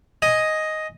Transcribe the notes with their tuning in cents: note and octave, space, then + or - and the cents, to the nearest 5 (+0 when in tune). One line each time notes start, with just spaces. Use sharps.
D#5 +5 G#5 +0